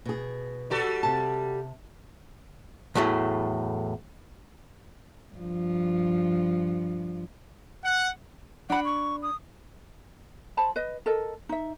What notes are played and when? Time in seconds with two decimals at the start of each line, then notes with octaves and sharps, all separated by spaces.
0.05 B2 G#4
0.70 G3 F#4 A4
1.03 C3 A5
2.95 E2 A2 F#3 A3
5.35 G2 F3
7.85 F#5
8.70 D4 F#5 B5
8.85 C#6
9.23 D#6
10.57 C5 A5 B5
10.76 B4 D#5
11.06 A4 A#4 D#5
11.49 D#4 E5